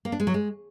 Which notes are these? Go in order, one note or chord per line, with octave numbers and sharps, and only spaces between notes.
A#3
D4
G#3
F#3
G#3